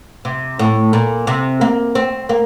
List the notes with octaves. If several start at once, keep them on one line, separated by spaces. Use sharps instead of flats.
C3
A2
A#2
C3
A#3
C4
A#3